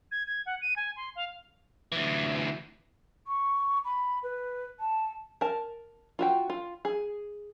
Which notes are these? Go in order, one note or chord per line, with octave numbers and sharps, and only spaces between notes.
G#6
G#6
F#5
D#7
G#5
C6
F5
D2 E3
C#6
B5
B4
A5
A#4 A5
F4 F#4 G5
F4
G#4